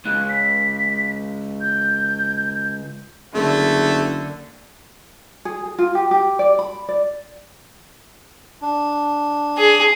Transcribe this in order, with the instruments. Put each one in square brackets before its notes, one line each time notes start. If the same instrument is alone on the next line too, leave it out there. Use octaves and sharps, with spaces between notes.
[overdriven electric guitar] C#2 [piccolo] F#6
[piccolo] B6
G6
[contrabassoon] F#1 [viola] D3 [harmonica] A3 [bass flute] G#4
[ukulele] G#4
G#4
F4
G4
G4
D5
B5
D5
[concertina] D4
[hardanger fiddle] G#4